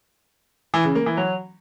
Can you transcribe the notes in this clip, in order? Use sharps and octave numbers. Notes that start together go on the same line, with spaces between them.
E3
C#3
A#3
E3
F#3